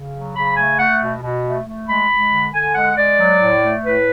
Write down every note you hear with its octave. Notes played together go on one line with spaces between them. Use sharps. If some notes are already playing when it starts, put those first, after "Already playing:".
Already playing: C#3
F#3
C#3 B5
A3 G#5
A3 F#5
B2
B2
A3
A3
G#3 B5
G#3
D3
D3 G#5
G#3 F#5
G#3 D5
F#3
A2
A3
A2 B4